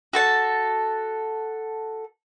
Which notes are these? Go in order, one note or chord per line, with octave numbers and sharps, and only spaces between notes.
F#4 A4 A5